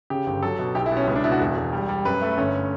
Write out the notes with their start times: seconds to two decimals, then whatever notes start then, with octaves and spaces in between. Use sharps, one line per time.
0.10 C#3 G4
0.26 G1
0.42 F#3 A4
0.59 B2
0.75 B1 G4
0.86 E4
0.91 B2
0.97 C#4
1.07 C#2 C#4
1.16 D4
1.24 B2 E4
1.32 F#4
1.40 E1
1.57 E1
1.73 G3
1.89 G3
2.05 F#2 B4
2.22 A3
2.38 G1 C#4